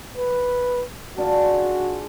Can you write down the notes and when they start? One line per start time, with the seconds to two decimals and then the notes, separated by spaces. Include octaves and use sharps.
0.17 B4
1.18 D4 F4 F#4 G#4